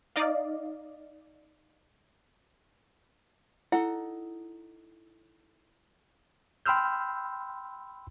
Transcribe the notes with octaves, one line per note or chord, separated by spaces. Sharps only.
D#4 D5 D#5 F5
D#4 E4 A4 F#5
G5 B5 C6 E6 F6 G6